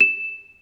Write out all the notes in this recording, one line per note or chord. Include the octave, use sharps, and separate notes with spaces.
E7